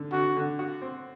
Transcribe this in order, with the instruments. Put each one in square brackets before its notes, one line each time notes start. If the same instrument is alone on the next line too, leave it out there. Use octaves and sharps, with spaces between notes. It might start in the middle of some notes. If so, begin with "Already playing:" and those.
Already playing: [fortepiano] D3
[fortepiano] D3 [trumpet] F#4
[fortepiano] D3
F#4
C4